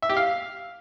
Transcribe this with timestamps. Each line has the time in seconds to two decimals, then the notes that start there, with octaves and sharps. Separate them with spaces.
0.02 E5
0.09 G4
0.17 F5